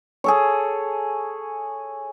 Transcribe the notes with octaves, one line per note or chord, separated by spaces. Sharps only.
G#4 A4 C#5